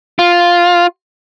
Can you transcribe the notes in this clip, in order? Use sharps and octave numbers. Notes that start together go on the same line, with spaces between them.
F4